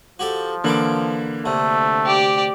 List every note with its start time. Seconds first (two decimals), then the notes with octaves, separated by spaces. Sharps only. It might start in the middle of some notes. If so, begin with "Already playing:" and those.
0.19 F3 F#4 G4 A4
0.64 D3 E3 A#3 E4 D6
1.46 D2 C3 A3
2.06 G4 D5